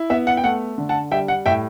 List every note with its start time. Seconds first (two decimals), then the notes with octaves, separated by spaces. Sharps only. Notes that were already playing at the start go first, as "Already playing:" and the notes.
Already playing: E4
0.10 B3 E5
0.27 F#5
0.37 G5
0.44 A3 F#5
0.78 D3
0.89 F#5 A5
1.11 G3 E5 G5
1.28 F#5
1.46 A2 E5 G5